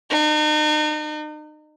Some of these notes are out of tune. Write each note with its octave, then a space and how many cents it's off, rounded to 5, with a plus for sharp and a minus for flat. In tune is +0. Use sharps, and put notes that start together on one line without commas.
D#4 -40